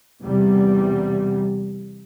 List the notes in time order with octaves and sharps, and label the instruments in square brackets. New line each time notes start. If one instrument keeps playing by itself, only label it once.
[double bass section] E2 C3 G3